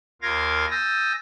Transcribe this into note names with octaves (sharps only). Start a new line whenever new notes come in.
D#2 F4 A#4 F5 G#6 A#6
G#5 D#6 E6 G6 A6 A#6